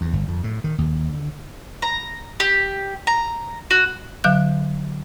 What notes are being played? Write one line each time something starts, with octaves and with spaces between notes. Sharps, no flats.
E2
G1
F2
A2
D#3
D#2
D3
A#5
G4
A#5
F#4
D3 F#3 F5 F#6 G6